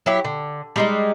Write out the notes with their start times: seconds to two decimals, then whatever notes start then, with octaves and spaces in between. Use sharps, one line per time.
0.06 F#3 E4 G4
0.24 D3
0.76 G3 G#3 D#4